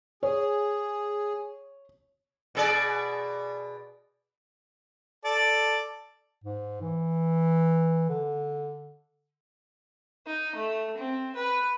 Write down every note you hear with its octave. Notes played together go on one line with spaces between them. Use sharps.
G#4 C#5
B2 G#4 D5
A4 D5
G#2
E3
D3
D#4
A3
C4
B4